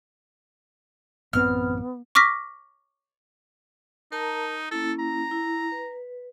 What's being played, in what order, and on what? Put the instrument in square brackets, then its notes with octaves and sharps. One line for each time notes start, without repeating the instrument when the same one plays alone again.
[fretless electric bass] A1 F#2 C4 [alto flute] B3 [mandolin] F6
[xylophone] C#6 D6 F6 A#6 B6
[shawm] D#4 [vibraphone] A#4 A5 A#5
[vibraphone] A#3 C#4 E4 [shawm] A4
[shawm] A#5
[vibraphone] E4
B4